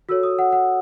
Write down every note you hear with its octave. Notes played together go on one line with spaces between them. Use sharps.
F#4 A4 C#5 E6
D#6
F#5
F#5